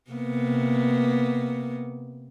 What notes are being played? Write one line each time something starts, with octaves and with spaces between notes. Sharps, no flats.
C3 A#3 B3